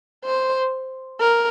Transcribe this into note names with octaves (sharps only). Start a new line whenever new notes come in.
C5
A#4